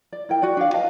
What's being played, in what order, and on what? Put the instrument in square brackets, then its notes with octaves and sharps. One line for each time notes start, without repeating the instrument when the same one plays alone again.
[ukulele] D5
E4 A#4 G5
F#4 D5
D4 F5
B4 D#5 F5 A5